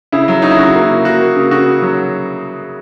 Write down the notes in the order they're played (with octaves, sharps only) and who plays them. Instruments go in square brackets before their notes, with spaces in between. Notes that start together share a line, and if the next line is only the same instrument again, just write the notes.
[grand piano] C#3 E4
F#3
F#3 D#4
E4
C#3 F#4
A#3
E4
C#3
A#3 F#4
A#3
C#3
C#3 F#4
C#3
F#3